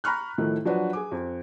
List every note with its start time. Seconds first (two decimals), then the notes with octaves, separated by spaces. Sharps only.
0.04 A#5 B5 C#6 F6 F#6
0.38 A2 D#3 F3 A3
0.65 F3 F#3 D4 F#4 B4
0.93 G#4 G#5 D6
1.12 F2